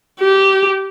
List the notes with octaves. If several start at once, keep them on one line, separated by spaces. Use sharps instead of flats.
G4